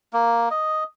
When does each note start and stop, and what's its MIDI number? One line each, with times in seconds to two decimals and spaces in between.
0.13 0.49 58
0.51 0.84 75